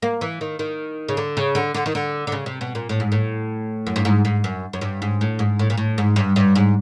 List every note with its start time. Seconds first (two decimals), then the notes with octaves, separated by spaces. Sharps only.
0.02 A#3
0.21 E3
0.41 D#3
0.59 D#3
1.09 C#3
1.17 D3
1.37 C#3
1.55 D3
1.74 D3
1.86 D#3
1.95 D3
2.27 D3
2.32 C#3
2.46 C3
2.61 B2
2.75 A#2
2.89 A2
3.00 G#2
3.12 A2
3.87 F#2
3.96 G2
4.05 G#2
4.25 G#2
4.44 F#2
4.73 F#2
4.81 G2
5.02 G#2
5.21 A2
5.39 G#2
5.59 A2
5.70 A#2
5.77 A2
5.98 G#2
6.16 G2
6.36 G2
6.55 G#2